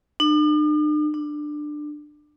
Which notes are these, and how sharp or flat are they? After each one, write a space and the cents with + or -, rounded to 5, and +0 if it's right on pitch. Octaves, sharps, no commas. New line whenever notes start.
D4 +45
D4 +20